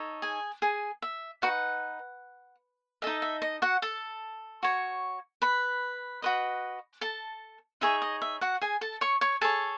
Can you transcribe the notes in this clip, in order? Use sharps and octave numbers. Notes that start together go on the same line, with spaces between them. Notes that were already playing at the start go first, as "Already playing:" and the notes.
Already playing: D#4 A4 C#5
G#4 G#5
G#4 G#5
E5
D#4 F#4 B4 F#5
D#4 A4 D#5 E5
E5
D#5
F#4 F#5
A4 A5
F#4 C#5
B4 B5
F#4 B4 D#5
A4 A5
D#4 G#4 C#5 E5
D#5
E5
F#4 F#5
G#4 G#5
A4 A5
C#5 C#6
C#5 C#6
G#4 A4 C#5 A5